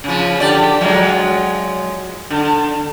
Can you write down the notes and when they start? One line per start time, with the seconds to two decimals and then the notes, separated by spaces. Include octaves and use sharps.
0.04 C#3 F3
0.40 D3 G4 D5
0.81 F3 F#3 G#3
2.30 D3